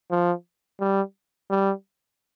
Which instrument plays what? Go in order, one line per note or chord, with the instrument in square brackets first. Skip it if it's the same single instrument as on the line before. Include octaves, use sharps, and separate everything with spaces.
[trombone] F3
G3
G3